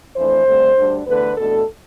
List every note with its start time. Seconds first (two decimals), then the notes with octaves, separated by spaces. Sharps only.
0.16 F2 E3 A3 D4 C5
0.46 G2 D3 A3 C4
0.77 D2 D3 G3 D4
1.07 E2 D3 A3 B4
1.37 E2 B2 A3 D4 A4